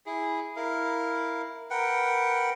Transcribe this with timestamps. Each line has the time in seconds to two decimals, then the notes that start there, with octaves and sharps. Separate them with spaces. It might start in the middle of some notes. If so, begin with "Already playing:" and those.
0.06 E4 G#4
0.56 E4 A#4 F5
1.70 A#4 B4 F#5 G5